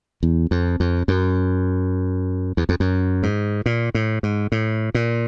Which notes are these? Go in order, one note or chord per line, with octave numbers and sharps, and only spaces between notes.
E2
F2
F2
F#2
E2
F2
F#2
G#2
A#2
A2
G#2
A2
A#2